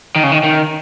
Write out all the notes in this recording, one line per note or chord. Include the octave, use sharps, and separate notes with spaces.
D#3
C#3
D#3
D#3